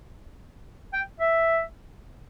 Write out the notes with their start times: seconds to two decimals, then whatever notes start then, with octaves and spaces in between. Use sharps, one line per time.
0.93 G5
1.20 E5